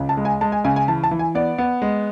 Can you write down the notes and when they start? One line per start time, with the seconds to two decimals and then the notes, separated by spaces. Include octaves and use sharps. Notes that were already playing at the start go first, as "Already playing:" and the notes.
Already playing: C#2
0.09 A5
0.17 G#3
0.25 G#5
0.41 G#3 A5
0.52 G#5
0.64 C#3 G#5
0.76 G#5
0.88 E3 A5
1.04 A5
1.11 E3
1.19 G#5
1.35 B3 D5
1.58 B3
1.82 G#3